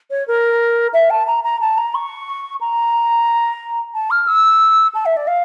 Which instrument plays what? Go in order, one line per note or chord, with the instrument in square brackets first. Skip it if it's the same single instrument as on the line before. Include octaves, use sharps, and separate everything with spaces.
[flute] C#5
A#4
E5
A5
A#5
A#5
A5
A#5
C#6
A#5
A5
F6
E6
A5
E5
D5
F5